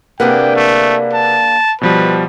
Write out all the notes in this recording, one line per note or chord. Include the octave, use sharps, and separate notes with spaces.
C3 A#3 D4 G#4 B4 F#5 G5
A3
A5
B2 F3 G3 B4